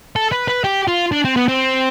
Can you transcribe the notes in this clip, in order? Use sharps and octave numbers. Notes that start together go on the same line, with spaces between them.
A4
B4
B4
G4
F4
D4
C4
B3
C4